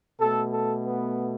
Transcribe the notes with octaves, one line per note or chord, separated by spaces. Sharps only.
B2 A3 A4
A4
B3